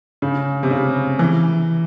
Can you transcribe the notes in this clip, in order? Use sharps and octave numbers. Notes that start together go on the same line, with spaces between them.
C#3
C3
C#3
E3